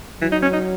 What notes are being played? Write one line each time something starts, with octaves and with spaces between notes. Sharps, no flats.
E3 F#3
D#4
C#4
D#4